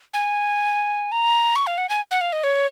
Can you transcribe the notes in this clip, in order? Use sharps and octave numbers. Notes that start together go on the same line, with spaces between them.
G#5
A#5
C#6
F5
F#5
G#5
F#5
F5
D#5
C#5